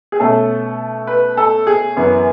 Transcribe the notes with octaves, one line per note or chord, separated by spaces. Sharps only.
G#4
B2 A3 C#4 A4
B4
A4
G#4
F#2 E3 B3